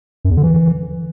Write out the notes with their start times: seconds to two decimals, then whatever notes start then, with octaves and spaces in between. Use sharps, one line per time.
0.25 F#2
0.31 E2
0.37 D3
0.43 E3